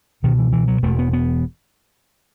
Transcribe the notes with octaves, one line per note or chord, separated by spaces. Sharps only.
C#2 B2 D#3
E3
E3
F#3
E1 E2 B2 A3
B3
B3